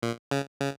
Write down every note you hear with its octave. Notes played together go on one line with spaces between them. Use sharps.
A#2
C#3
C#3